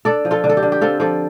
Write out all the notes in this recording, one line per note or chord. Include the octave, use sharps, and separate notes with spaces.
D4 A4 D5
F3
F4 A4
D3
A4
G4
D3
G4
C4 F4 A4
F3 A4 D5